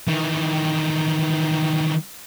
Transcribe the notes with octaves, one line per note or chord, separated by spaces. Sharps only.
D#3 E3